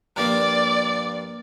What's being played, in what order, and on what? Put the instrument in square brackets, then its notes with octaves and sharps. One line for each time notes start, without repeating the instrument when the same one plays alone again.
[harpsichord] G2 F3 A#3 [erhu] D5